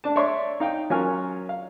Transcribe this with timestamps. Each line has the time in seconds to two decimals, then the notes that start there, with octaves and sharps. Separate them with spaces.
0.04 D4 A5
0.16 C#5 D5 E5 C6
0.60 D#4 F5 G5
0.90 F#3 C#4 F4 A#4 G#5 F6
1.49 F5